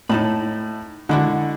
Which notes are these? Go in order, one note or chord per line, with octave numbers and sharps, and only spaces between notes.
A2 D#4 E4 A5 B5
D3 G#3 E4 F#4